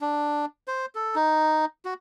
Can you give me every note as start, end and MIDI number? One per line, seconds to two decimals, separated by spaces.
0.01 0.46 62
0.68 0.86 72
0.95 1.15 69
1.15 1.65 63
1.85 1.94 66